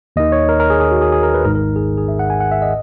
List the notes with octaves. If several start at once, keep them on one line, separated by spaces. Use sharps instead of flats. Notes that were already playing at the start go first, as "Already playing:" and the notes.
D#2 D#3 D#5
C#5
A#4
A#4
G#4
G#4
F#4
G#4
G#4
A#4
B4
G#1 G#2 D#3 A#4
A#4
G#4
G#4
E5
F#5
G#5
F#5
E5
D#5